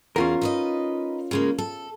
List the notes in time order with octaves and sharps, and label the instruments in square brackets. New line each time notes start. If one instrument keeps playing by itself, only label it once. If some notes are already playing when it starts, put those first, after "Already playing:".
[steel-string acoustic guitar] E2 G#4 F5 [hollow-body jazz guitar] C#4 F4 A#4
[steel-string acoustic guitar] D#4 B4 D#5
C#3 G#3 A#3
A4